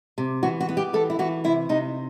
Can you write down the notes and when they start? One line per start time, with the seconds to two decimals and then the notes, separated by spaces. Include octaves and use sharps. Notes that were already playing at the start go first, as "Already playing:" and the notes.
0.18 C3
0.43 E3 F#4
0.60 F#4
0.69 B3
0.77 G4
0.93 E3 A4
1.10 E4
1.19 E3 F#4
1.44 C3 E4
1.69 C3 D#4